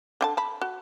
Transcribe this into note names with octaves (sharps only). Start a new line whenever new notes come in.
D3 G5 A5
A5 B5
F#4